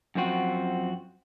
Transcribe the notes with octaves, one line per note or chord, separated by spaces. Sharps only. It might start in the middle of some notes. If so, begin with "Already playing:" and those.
F#2 F3 C4 F#4